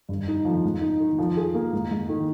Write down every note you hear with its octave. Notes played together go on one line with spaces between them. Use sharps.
G2
D#4
F3
G#2
D#4
D#3
F3
G#4
A#3
G#2
G#2
D#3